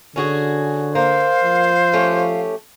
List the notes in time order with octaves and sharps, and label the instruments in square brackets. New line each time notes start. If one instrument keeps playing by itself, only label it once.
[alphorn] D3 [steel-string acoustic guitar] C#4 F#4 G#4
[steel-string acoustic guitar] A#3 [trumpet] C5 [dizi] F5
[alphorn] F3
[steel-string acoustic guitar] A3 C#4 G4